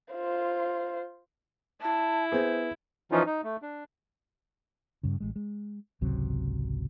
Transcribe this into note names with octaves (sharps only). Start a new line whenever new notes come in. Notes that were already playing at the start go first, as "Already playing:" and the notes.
F4 C5
E4 A5
B3 G#4 C5
E3 F3 C#4 D#4 F4
D#4
A3
D4
G2 C#3
A1 G#3
G#3
G#1 C#2 C3 F#3